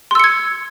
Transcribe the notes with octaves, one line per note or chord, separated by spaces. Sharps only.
C6 E6 G#6 C#7